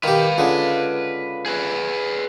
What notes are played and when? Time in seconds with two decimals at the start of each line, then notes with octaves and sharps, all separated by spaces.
0.03 D#3 G4 B4 F5
0.38 C#2 D3 G#3
1.46 G#4 B4